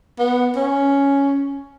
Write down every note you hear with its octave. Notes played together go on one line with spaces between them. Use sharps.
B3
C#4